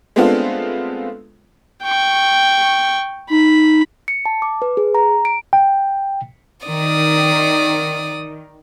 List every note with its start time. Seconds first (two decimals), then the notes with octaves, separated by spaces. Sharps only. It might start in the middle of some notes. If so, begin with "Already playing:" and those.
0.16 G#3 A3 B3 C4 D4 F4
1.84 G5 C#6
3.30 D#4 B5
4.08 C#7
4.25 A5
4.42 D6
4.62 B4
4.77 G#4
4.95 A#5
5.25 D7
5.53 G5
6.67 D#3 D5 D#6